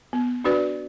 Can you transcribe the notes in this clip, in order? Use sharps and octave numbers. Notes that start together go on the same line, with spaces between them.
B3
D4 F#4 B4 D5